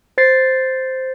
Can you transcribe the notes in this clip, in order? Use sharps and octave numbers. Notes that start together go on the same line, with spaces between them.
C5 A6 C7